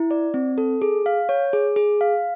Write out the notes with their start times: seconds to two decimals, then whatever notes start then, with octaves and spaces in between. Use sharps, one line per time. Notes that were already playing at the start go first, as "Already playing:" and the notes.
Already playing: E4
0.11 D5
0.34 C4
0.58 A4
0.82 G#4
1.06 F5
1.29 C#5
1.53 G#4
1.76 G#4
2.01 F5